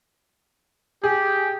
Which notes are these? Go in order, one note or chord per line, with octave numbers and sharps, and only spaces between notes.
G4 G#4